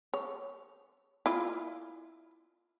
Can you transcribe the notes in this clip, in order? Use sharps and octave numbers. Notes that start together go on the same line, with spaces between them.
C#5
E4 F4